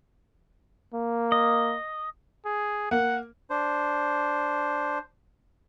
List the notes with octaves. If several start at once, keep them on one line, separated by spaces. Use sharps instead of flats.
A#3
D#5
G#4
A#3 F#5
D4 C5